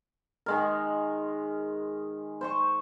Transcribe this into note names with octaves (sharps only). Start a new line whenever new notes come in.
D#3 G#3 A#4
C5 C6 C#6